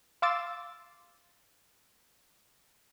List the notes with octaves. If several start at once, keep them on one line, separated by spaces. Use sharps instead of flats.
F5 C6 D6 E6 A6